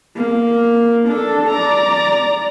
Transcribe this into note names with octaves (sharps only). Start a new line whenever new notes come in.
A#3
D4 A4
D5 A#5